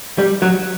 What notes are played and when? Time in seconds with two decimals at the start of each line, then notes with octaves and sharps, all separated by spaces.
0.18 G3
0.42 F#3